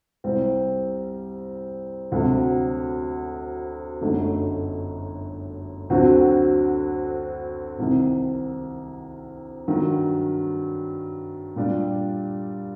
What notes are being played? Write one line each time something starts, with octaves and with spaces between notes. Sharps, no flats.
C2 C3 G3 C4
D2 C3 F#3
G1 F#2 D3 A3 D#4
D2 D3 F#3 C4 F#4
C2 C3 D#3
G2 D#3 F#3
A#2 G3 D4